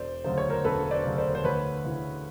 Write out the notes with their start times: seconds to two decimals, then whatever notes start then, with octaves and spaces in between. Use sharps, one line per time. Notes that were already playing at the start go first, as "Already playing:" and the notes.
Already playing: E1 C5 D5
0.24 D2 C#3 F#3 C5
0.38 C#5
0.50 A#4 C5
0.64 E1 A4 B4
0.91 C5 D5
1.05 D2 C#3 F#3
1.18 C5 D5
1.35 C5
1.44 D2 B4 C#5
1.84 C#3 E3